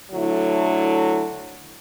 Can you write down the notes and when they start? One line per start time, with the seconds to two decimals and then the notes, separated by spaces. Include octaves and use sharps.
0.11 D3 F#3 A3 E4